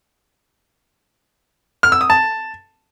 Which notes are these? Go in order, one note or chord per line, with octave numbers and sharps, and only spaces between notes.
F6
E6
D#6
A5